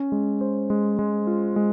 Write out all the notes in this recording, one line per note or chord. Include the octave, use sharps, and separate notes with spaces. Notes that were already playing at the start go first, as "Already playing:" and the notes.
Already playing: C#4
G#3
C5
G#3
G#3
F4
G#3